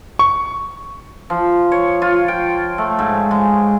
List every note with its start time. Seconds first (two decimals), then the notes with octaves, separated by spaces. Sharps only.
0.19 C#6
1.30 F3
1.72 C#5
2.02 F4
2.28 G5
2.78 A3
2.99 G#2
3.31 G#3